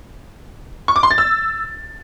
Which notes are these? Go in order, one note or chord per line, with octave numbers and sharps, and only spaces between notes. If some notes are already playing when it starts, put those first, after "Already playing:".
C#6
D6
C6
A6
E6